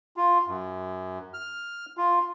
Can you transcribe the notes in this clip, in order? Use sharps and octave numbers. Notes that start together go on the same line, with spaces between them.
F4
F#2
F6
F4